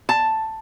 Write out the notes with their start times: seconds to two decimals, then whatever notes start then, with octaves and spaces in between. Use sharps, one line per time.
0.09 A5